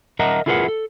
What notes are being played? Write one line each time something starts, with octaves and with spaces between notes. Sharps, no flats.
A#4 D#5 E5 F#5 A5 A#5
E4 F4 G#4 A#4 B4 F#5
A4